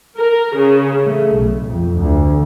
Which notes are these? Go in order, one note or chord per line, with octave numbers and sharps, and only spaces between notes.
A#4
C#3
A3
B1
F2
D2